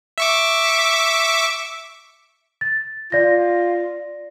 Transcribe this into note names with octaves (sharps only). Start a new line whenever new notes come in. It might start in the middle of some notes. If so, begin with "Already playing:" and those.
E5 C#6 D6
A6
F4 D5 A#6